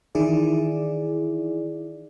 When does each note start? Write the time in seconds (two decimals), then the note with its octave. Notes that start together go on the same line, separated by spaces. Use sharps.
0.15 D#3 E3 E4 G#4 D5